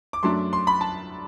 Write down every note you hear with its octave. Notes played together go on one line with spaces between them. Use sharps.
D6
F#2 F#3 A3 D4 C6
C6
B5
A5